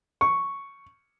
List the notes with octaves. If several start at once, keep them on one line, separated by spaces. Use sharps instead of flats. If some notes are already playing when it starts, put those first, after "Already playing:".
C#6